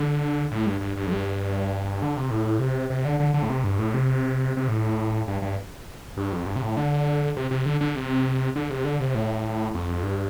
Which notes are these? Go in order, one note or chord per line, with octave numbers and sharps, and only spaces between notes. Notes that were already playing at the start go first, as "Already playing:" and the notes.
Already playing: D3
A2
G2
G2
G2
F2
G2
D3
C3
A2
C3
C3
D3
D3
D3
A2
C3
G2
A2
C3
C3
A2
G2
G2
G2
F2
G2
C3
A2
D3
C3
C3
D3
D3
C3
D3
C3
D3
C3
A2
F2
G2